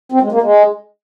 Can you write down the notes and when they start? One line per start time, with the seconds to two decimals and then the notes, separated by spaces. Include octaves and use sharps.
0.12 C4
0.22 G#3
0.32 A#3
0.42 G#3